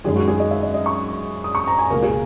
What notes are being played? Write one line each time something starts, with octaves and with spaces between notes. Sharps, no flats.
F#2 D#3 G#3 G#4
F#4
G#4
D#5
E5
D#5
D#5
C#6
D#6
C#6
A#5
G#5
C#2 B2 A#3 A#4
G#4